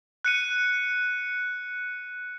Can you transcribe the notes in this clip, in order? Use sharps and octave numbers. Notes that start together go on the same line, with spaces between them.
F#6 C#7 D#7